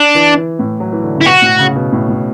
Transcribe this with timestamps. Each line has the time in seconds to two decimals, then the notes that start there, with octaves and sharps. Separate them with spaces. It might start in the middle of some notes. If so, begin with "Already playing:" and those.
Already playing: D4
0.15 E3
0.37 E3
0.59 A2
0.80 F#3
0.92 E3
1.03 D3
1.15 C#3
1.21 E4
1.25 B2 F#4
1.42 A2
1.59 C#3
1.76 B2
1.92 A2
2.09 A2